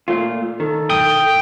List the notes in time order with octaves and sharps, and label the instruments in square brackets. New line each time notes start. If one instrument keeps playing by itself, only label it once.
[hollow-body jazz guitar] A#2 A3 F4
[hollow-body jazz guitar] D#3 [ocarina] A4
[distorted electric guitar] G5 [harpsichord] D#6